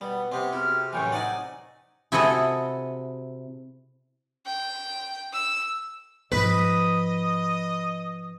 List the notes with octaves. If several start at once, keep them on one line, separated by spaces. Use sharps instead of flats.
B2 G3 B3
C3 B3 C4
F#2 E4 G#4 F6
F#2 A2 E3 G5 C#6
C4 D#4 D5 F#5 G#5
C3 E4 F#4 G#4 A4 D#5
G5
E6
G#2 F3 B4 D#5 D#6